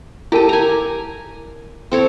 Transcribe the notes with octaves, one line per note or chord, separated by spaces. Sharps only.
E4 G4 A4 A#4 A5
G#5 A#5
C4 A4 C#5